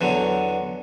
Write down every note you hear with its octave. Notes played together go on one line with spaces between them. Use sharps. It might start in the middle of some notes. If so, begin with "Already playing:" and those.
E2 D3 F#3